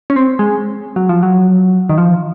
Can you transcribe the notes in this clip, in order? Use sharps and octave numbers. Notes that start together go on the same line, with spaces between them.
C#4
C4
G#3
F#3
F3
F#3
D#3
F3